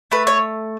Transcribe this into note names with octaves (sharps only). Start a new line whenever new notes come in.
A3 B4
C#5